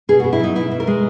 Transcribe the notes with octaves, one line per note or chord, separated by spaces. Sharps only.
B2 G#4
B2 F#4
E4
F#3 D#4
B2 E4
B2
A#4
G#3